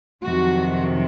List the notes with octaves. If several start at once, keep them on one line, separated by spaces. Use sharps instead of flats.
F2 C3 D#3 F#3 F#4